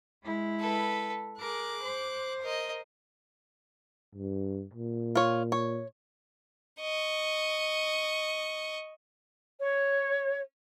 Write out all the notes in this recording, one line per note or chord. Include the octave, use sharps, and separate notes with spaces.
G#3 E4
A4 B4
G#4 A#4 D6 F#6
C5
A#4 D#5
G2
A#2
F4 C#5
C#5
D#5 C#6
C#5